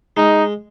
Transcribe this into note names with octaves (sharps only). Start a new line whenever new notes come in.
G#3 D#4